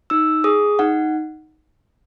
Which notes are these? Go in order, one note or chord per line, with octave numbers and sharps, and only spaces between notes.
D#4 E6
G#4 D#6
D#4 F#5